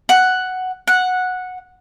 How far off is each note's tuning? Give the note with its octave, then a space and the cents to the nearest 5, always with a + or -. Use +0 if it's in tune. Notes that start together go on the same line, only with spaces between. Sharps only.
F#5 +5
F#5 -10